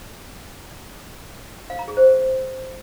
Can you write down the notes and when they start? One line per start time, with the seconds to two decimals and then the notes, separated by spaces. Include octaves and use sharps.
1.70 F5
1.79 A#5
1.88 G#4
1.97 C5